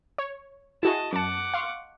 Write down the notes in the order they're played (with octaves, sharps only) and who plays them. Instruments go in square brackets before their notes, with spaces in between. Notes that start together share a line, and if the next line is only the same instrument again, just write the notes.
[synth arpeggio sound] C#5
[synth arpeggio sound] E4 F#4 G#4 [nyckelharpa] D#5 A5
[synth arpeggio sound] F#2 A5 [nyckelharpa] F#5 D6
[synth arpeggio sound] F5 C6 C#6